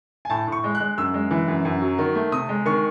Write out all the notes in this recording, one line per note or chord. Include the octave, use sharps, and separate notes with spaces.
G#5
A2 A5
A2
C#6
G#3
F#6
G#3
F#2 E6
G#3
E3
F#2
F#2
F#3
D#3
A3
C3 D#6
G#3
D#3 C#6